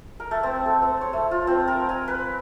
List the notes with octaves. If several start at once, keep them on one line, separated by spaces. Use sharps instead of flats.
A#4
A3
C4
A4
C4
C#5
A3
F4
C4
A#4
G#5
B4